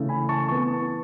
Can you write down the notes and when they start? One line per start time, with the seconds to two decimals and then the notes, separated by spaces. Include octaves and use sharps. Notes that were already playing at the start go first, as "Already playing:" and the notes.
Already playing: C#3 E3 A3 C#4
0.09 G#5 B5
0.29 A5 C#6
0.48 E3 B3 A5 C#6